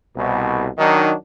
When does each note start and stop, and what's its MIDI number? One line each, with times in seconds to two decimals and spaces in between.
0.16 0.68 36
0.16 0.68 47
0.78 1.13 51
0.78 1.13 54
0.78 1.13 62
0.78 1.13 63